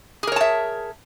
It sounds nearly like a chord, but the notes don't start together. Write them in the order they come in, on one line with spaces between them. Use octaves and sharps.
G#4 A#4 C#5 A5 E5